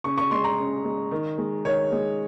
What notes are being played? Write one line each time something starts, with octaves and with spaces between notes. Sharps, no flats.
C#3 C#6
C#6
G#3 C6
A#5
C#3
G#3
D#3
G#3
D#3 C#5
G#3